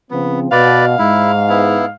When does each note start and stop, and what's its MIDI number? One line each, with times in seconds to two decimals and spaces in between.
0.11 0.47 49
0.11 0.47 53
0.11 0.40 59
0.11 0.47 60
0.52 0.97 47
0.52 0.85 71
0.52 0.85 74
0.52 1.93 77
0.99 1.90 44
0.99 1.32 64
1.49 1.85 59
1.49 1.85 64